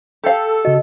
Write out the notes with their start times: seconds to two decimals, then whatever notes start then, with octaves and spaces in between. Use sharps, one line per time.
0.24 G4 A4 F5
0.65 C#3 F#4 D#5